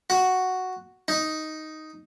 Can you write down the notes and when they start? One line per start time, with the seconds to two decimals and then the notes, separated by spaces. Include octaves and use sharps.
0.10 F#4
1.08 D#4